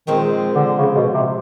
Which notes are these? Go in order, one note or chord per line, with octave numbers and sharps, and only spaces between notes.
A#2 D#3 F3 G#3 C4
D3
C#3
B2
C3